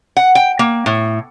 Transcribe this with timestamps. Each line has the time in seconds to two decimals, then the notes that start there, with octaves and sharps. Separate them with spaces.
0.17 F#5
0.35 G5
0.59 A#3
0.86 A2